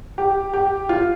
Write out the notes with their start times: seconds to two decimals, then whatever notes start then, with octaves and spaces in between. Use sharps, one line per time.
0.18 G4
0.54 G4
0.89 F4